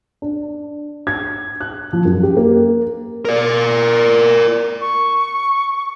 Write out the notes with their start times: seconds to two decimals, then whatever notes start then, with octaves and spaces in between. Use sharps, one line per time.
0.22 D4
1.07 G#6
1.61 F#6
1.93 F3
2.05 F#2
2.23 G4
2.37 A#3
3.25 A#4 D5
4.81 C#6